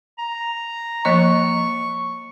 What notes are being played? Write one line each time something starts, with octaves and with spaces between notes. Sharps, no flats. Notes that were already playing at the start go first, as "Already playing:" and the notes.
A#5
F3 A#3 D#5 C#6